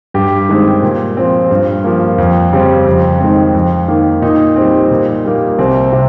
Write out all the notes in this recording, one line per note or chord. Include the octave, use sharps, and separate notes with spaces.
G2 G4
D#3 G#3 C4
A#2
F3 C4
G2
F3 A#3
F2
C#3 G3 C4
F2
D#3 G#3 C4
F2
D#3 A#3
A#2 D#4
G3 C4
A#2
G3 A#3
C2 C4
C3